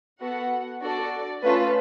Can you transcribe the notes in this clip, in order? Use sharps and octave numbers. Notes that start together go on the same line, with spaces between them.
B3 F#4 A4 F#5
D4 F#4 A4 D5
A3 C#4 F4 A4 B4